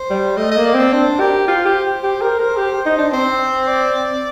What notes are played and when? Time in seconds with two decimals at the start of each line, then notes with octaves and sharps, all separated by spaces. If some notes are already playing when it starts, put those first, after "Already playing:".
Already playing: C5
0.10 G3
0.37 A3 D#5
0.51 D#5
0.57 A#3
0.65 D5
0.74 C4
0.80 D5
0.92 D4 C5
1.20 G4 A#4
1.48 F4 C5
1.66 G4
2.03 G4
2.22 A#4
2.40 A#4
2.58 G4
2.86 D#4
2.99 D4
3.13 C4 C5
3.67 D5